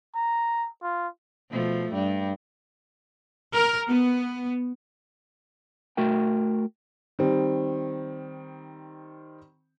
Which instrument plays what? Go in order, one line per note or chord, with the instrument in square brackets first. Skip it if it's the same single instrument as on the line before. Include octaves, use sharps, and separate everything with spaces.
[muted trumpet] A#5
F4
[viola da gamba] B2 F3 A3
G2 G3
[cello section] A#4
B3
[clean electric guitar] A3 F#4 A#4 G5
[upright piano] D#3 G3 C4